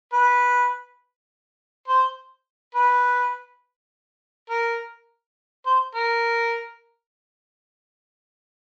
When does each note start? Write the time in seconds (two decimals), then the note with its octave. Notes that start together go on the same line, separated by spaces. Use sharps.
0.13 B4
1.88 C5
2.75 B4
4.50 A#4
5.66 C5
5.95 A#4